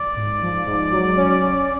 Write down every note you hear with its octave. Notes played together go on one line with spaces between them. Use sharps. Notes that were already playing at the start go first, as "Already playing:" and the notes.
Already playing: D5
G#2
F3
G#2
F#3
C#4
C#4